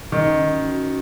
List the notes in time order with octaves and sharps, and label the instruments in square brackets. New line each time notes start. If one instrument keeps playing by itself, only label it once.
[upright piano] D#3 [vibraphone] C#4
[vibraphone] C#4
F#4
F#4